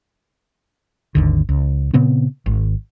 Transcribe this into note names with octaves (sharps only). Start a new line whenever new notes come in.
G#1 D#2 D3
C#2
A#2 C#3 B3 C4
G#1